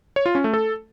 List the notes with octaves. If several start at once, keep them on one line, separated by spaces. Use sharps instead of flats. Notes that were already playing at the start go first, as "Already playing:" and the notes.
C#5
F4
C#4
A3
A4